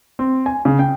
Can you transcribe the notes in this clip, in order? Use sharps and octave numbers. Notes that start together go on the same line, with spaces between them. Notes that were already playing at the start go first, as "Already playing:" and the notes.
C4
G#5
C#3
G5